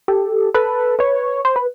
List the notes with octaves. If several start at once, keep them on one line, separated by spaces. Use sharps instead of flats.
G4 A4
A4 B4
B4 C#5
C5
B4